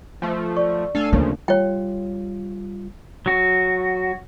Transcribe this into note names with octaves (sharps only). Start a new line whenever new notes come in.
F3 A3
D5 C#6
A3 D4 A4 F5 G#5
D2 C#3 F3 A#3
G3 F4 C#5 G5
F#3 F#4